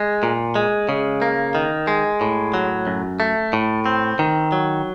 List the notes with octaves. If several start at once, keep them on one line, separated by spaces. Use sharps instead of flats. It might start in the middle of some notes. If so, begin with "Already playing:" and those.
Already playing: G#3
A#2
G#3
C#3
A#3
D#3
G#3
A2
F#3
F#2
A3
A2
C4
D#3
F#3